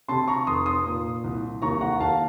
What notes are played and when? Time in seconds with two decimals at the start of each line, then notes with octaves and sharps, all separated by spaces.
0.08 C3 A5 C6
0.28 A#5 C#6
0.47 F1 C6 D#6
0.66 C6 D#6
0.86 A#2
1.24 C2
1.62 D#2 A#5 C#6
1.81 F#5 A#5
2.00 D#2 F5 A5